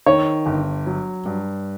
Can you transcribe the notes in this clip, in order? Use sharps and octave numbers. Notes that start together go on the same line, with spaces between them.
D#3 C#5
G1
F#3
G2